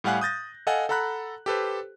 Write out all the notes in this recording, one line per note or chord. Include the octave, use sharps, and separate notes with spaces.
A2 G3 F5 F#5 G#5 F#6
D#6 G6 A6 A#6
A4 D#5 F5 F#5 G#5
A4 F#5 A#5 B5 F#6
G4 A4 B4 C5